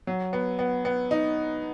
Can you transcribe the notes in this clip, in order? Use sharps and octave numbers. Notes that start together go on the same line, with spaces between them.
F#3
B3
B3
B3
D#4